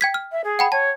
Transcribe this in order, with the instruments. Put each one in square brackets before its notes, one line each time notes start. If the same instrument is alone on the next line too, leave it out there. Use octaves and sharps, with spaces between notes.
[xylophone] G5 G#6 B6
F6
[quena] E5
G#4
[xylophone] F#5 G5 B5
[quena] C#5 [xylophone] A5